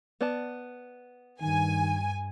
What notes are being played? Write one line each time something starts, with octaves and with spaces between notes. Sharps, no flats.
B3 D5 A5
G2 D#3 G#5